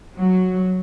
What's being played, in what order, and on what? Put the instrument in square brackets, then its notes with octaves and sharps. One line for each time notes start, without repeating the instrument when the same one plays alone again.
[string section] F#3